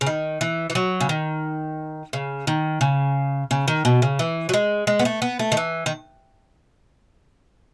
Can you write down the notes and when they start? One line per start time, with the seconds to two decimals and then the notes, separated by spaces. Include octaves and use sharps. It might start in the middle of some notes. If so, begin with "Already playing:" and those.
0.01 C#3
0.06 D#3
0.41 E3
0.70 E3
0.75 F#3
1.00 C#3
1.09 D#3
2.13 C#3
2.47 D#3
2.81 C#3
3.51 C#3
3.68 D#3
3.85 B2
4.02 C#3
4.19 E3
4.49 F#3
4.54 G#3
4.87 G#3
4.99 B3
5.05 A3
5.22 B3
5.39 A3
5.52 D#3
5.57 E3
5.86 D#3